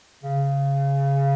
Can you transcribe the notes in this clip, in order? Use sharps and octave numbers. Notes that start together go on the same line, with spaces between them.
C#3